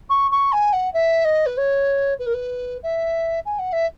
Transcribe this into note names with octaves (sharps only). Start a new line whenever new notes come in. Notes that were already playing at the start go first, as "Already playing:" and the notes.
C#6
C#6
G#5
F#5
E5
D#5
B4
C#5
B4
A#4
B4
E5
G#5
F#5
E5